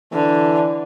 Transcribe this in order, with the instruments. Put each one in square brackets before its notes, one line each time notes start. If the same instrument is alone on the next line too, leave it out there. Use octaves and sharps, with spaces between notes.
[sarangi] D3 [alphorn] E3